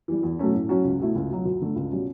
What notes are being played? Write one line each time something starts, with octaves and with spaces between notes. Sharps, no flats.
E3 G3
E2
B2 F#3 A3 C#4
A2
F#3 C#4 F#4
C#2
B2 A3 E4
C#2
B2 F#3
D2
D3 A3
C#2
B2 G3 C#4